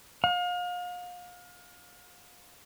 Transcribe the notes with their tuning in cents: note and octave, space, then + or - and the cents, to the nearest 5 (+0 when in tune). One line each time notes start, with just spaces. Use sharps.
F5 +35